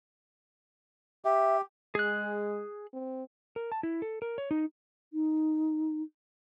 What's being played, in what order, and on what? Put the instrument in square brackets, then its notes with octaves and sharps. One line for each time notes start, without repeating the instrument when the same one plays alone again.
[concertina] G4 [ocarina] E5
[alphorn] G#3 [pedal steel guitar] G#4 F#6
[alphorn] C4
[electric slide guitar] A#4
A5
E4
A4
A#4
C#5
D#4
[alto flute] D#4